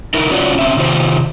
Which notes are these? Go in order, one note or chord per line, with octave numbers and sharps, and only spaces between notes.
D#4 E4 A#4 B4
C#4 F4 F#4 B4 C#5 D5
C4 C#4 E5
C3 D#3 F4 G4 C5